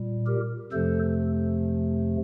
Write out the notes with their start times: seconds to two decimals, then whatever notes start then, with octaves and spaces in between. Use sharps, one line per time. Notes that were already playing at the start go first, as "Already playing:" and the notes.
Already playing: A#2 G3
0.26 G4 A#4
0.72 F2 C3 F3 A3 A4 C5